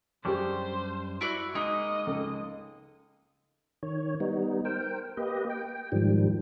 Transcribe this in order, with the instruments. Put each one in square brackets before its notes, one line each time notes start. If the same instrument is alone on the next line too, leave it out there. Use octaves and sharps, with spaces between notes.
[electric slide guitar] F#2 G3 D4 [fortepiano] G4 G#4 C#6 [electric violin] C5
[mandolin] E4 F#4 D5
[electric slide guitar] G#3 A#3 [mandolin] D#4 [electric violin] D#5
[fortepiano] C#2 A4
[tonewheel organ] D#3 C#5
G3 B3 D#4
A#4 C5 G5
A#3 G4 B4 D#5
G5
G#2 D#3 F3 G3